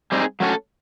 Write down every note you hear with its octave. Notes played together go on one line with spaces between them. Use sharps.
G3 C4 D#4 G#4
F#3 A3 C#4 F#4 A4